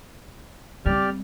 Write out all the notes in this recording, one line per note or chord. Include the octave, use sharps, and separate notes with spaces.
G3 C4 G4 D5 F6